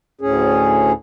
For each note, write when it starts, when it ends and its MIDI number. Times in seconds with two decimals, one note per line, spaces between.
0.21 0.92 38
0.21 0.92 45
0.21 0.92 61
0.21 0.92 68